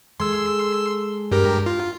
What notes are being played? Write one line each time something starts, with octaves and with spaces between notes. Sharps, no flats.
G#3 G#4 A4 C6 E6
G2 G4 A#4
F4